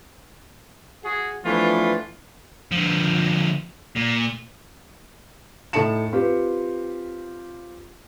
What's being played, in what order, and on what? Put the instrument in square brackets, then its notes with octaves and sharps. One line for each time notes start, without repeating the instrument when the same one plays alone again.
[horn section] F#4 G#4
E3 F3 A3 B3 D4 F4
[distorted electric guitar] D3 F3
A#2
[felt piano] A2 A3 D#4 A5 C#7 E7
C4 F4 G4 B4